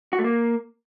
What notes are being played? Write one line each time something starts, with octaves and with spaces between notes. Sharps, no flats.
F#4
A3
A#3